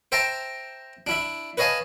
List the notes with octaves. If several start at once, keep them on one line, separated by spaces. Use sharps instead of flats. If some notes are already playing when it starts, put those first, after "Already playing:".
C5 E5 G5 A5 A#5
D4 E4 E5
B4 C#5 D#5 F5 G#5 A5